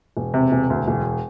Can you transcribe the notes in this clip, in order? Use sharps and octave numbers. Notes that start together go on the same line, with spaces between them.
E1
C3
E1
D2
E1